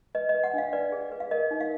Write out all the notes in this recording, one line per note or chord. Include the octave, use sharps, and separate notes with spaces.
B4 D#5
D#5
B4
F#5
D4 F5
B4 D5
G#4
B4
F5
A#4 D#5
D#4
F5